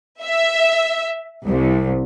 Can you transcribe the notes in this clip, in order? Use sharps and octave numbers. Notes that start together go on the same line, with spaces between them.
E5
C2